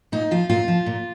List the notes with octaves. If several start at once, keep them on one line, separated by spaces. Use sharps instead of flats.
A#2 D#4
F3 F4
A#2 F4
F3
A#2